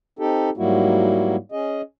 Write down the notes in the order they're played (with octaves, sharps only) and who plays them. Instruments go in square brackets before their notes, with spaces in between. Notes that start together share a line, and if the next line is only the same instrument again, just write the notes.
[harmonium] C4 D#4 G4 A4
G#2 F#3 G3 A#3 E4 F#4
C#4 G#4 D#5